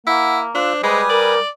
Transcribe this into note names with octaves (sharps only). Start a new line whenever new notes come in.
A#3 E4 F#5
D4 F4 C5 E6 F#6
G3 G#3 B4 G#5 D#6
A#4 D5